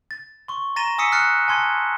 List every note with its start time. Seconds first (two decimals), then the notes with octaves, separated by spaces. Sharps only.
0.11 A6
0.48 C6 C#6
0.76 A#5 A6 A#6 D#7 E7 G7
0.98 G#5 D#6 E6 B6 C#7 D#7
1.12 F6 F#6 A6 C7 C#7
1.48 G#5 A5 C6 G#6